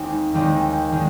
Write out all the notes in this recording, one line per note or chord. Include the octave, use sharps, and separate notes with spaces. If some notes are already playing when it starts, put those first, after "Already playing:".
Already playing: D#2 D#3 G#3 C4 D#4
D#2 D#3 G#3 C4 D#4
D#3 G#3